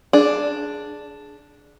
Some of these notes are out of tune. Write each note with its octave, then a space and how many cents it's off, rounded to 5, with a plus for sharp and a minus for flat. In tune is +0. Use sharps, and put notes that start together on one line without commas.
D4 +0 G#4 +20